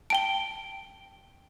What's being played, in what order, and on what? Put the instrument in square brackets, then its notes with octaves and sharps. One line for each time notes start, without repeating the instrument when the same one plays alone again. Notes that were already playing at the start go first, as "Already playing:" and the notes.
[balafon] G5 A5 [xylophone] D7 G7